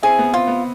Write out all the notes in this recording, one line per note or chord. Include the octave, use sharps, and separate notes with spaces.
C4 E4 G#4
B3
C4 F4
B3